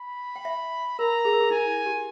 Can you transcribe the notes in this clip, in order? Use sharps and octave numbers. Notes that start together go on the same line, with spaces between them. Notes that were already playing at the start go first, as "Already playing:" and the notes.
Already playing: B5
G5
E5
A#4 A#5
G#4
A#4
G#4
E4 G#5
G4